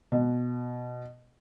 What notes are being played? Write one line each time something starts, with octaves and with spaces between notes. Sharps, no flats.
B2